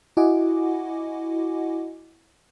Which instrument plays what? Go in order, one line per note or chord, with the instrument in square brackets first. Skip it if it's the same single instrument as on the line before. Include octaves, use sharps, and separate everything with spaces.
[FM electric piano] E4 F#4 D#5 F#5 G#5 D6